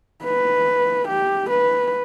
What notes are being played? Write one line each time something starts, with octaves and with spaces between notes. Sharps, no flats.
B4
G4
B4